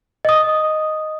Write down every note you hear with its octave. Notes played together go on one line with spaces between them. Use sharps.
D#5 D#6